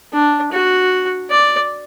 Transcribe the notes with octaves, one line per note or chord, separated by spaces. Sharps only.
D4
F#4
D5